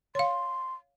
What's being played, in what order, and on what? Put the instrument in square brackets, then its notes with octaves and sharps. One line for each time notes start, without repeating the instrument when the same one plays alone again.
[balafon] C#5 F5 [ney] C6